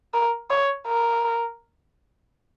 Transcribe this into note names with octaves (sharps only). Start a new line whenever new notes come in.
A#4
C#5
A#4